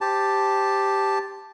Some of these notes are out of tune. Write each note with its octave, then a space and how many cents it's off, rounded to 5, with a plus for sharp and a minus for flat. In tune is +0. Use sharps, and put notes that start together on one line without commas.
G4 +5 C5 +0 A5 +0